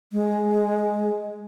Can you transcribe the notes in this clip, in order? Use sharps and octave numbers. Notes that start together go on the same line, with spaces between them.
G#3